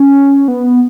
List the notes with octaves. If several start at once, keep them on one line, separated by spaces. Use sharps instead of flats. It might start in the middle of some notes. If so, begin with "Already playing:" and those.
Already playing: C#4
B3